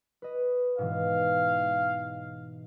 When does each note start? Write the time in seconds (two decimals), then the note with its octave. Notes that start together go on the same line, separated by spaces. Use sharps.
0.22 B4 D#5
0.78 G#2 B2 E3 F5